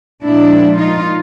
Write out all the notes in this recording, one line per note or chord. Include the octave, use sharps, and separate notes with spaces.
A#2 F3 G#3 D4 E4
D#4 F4